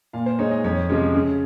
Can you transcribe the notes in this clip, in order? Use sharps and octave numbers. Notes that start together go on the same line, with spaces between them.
A#2 F5
C5
G#3 D#4 C#5
D#5
F2 C#5
C3 F3 G#3 C#4
C#3